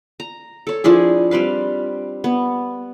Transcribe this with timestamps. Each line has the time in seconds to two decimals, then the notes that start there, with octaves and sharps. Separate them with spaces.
0.20 A#5
0.67 A4 C#5
0.84 F3 D4 E4 G#4
1.31 G3 C4 B4 F5
2.24 B3